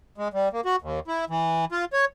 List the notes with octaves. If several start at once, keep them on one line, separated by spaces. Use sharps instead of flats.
G#3
G3
A#3
F#4
D#2
E4
E3
F4
C#5